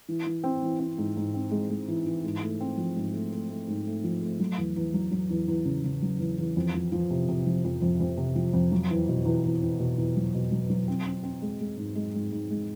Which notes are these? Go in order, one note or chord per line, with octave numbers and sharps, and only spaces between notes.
E3
E3
C4
E3
C4
G#2
G#2
C4
G#3
G#3
E3
E3
G#2
A3
C4
F3
G#2
A3
A3
A3
G#2
A3
F3
A3
F#3
E2
E2
F#3
F#3
E2
E2
C#3
C#3
F#3
E2
E2
F2
F3
F3
C3
C3
F3
F2
F2
F2
C3
F3
F2
F#3
E2
B2
E2
E2
E2
B2
E2
F#3
B2
F#3
F#3
C4
C4
C4
G#3
G#3
G#2
G#3
G#2
G#2
G#3